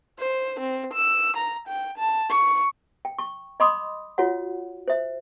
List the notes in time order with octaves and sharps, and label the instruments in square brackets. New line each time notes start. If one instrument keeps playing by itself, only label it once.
[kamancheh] C5
C4
E6
A#5
G5
A5
C#6
[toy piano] G5
C#6
D#5 B5 C6 D6 D#6
F4 F#4 C#5 F#5
C5 E5